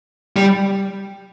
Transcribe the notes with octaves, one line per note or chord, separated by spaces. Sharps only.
G3